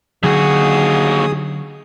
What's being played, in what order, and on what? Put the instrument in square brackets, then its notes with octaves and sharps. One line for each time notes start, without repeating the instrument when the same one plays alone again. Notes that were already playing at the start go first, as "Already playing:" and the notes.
[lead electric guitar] D#2 F#4 [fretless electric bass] D3 F#3 [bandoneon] G#4 D#6